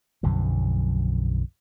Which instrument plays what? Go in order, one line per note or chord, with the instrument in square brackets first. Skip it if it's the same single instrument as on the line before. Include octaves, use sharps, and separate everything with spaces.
[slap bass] B1 F#2 D3 F3